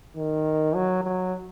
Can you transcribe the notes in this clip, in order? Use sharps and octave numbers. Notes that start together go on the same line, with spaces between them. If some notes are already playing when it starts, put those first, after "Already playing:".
D#3
F#3
F#3